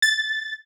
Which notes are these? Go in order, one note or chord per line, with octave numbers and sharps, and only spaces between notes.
A6